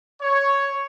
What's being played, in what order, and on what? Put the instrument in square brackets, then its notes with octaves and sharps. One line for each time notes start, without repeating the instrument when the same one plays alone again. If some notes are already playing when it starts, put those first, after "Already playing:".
[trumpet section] C#5